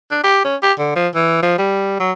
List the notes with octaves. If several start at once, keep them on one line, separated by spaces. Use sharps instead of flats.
D4
G4
C#4
G4
D3
F3
E3
F3
G3
F#3